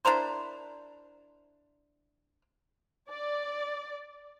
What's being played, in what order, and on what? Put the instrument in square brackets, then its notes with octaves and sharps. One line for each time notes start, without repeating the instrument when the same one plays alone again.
[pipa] D4 E4 A#4 C5
[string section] D5